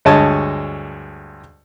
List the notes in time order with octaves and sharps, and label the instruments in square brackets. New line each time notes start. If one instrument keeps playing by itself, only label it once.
[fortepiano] D2 G2 G#3 C#5 D#5 A5